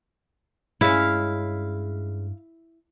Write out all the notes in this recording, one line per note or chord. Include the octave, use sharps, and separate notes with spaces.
G2 G#3 C#4 E4 F5